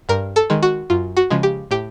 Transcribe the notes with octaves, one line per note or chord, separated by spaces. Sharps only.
G2 A#4
A4
D#3 G#3
F#4
F#2 F4
F#4
C#3 F3 G#3
G4
A2 G4